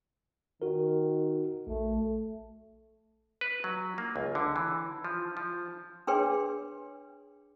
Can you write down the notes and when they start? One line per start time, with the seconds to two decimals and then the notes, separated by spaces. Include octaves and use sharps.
0.62 D#3 F#4 A#4
1.67 A#1 A3
3.41 B4
3.64 F#3
3.98 A#3
4.16 C#2
4.35 D3
4.56 E3
5.05 F3
5.37 F3
6.07 D4 G#4 B4 C#5 G5 C6